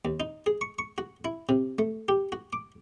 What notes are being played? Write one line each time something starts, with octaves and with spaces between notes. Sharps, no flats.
D#2
D#4
G#4
C#6
C#6
F#4
E4
C3
A3
G4
F#4
D6